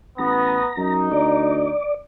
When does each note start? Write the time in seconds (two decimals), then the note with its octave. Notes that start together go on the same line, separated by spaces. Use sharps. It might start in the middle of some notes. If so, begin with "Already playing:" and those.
0.18 A1 B3 A#5 D#6
0.77 F#2 D#4
1.11 D2 D5